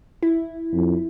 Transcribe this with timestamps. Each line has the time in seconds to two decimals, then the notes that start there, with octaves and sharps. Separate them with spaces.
0.23 E4
0.73 F2